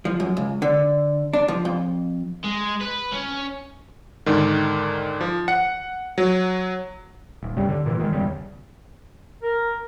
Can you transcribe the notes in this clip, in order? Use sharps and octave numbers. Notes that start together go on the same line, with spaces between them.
F3
F#2
C#2
D3
D4
F3
F2
G#3
B4
C#4
G#2 D3 D#3
F3
F#5 C#7
F#3
D#1
D1 G2 C#3 G3
D3
A#2 E3
D#3 F#3 G#3
E2 C#3 G3
A#4